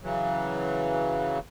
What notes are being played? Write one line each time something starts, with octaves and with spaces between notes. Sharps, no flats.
C#3 E3 F#3